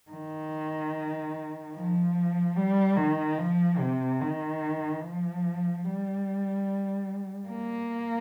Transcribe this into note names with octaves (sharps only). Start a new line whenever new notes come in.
D#3
F3
G3
D#3
F3
C3
D#3
F3
G3
A#3